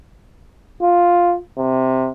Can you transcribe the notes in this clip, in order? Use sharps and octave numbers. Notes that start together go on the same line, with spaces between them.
F4
C3